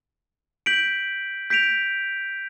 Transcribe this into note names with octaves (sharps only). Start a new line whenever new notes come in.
G6 B6 D7 F#7
G6 B6 D7 F7